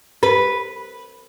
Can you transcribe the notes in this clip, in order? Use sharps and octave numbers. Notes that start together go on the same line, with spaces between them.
B4